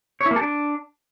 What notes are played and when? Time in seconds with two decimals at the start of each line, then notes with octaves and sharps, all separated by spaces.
0.21 C#5
0.26 E4
0.31 A#3
0.36 A4
0.41 D4